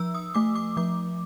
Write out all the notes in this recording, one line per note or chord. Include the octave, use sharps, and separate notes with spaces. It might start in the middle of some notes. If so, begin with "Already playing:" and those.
Already playing: F3 E6
D#6
A3 D6
D6
F3 D6